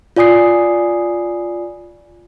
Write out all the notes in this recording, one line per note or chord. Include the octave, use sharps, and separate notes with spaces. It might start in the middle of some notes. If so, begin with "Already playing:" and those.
F4 D5 G#5 D#6 C7